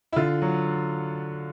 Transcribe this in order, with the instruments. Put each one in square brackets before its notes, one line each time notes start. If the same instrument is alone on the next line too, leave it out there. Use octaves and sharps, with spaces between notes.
[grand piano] E4
D3 F4
F#3